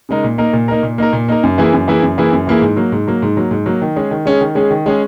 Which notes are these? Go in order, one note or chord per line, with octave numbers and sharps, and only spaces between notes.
C#3 G#3 D#4 A#4
A#2
A#3 D#4 A#4
A#2
A#3 D#4 A#4
A#2
A#3 D#4 A#4
A#2
A#3 D#4 A#4
F#2
E3 A#3 E4 G#4
F#2
E3 A#3 E4 G#4
F#2
E3 A#3 E4 G#4
F#2
E3 A#3 E4 G#4
G#2
F#3 A#3
G#2
F#3 A#3
G#2
F#3 A#3
G#2
F#3 A#3
D#3
G#3 C#4 G#4
D#3
G#3 C#4 G#4
D#3
G#3 C#4 G#4
D#3
G#3 C#4 G#4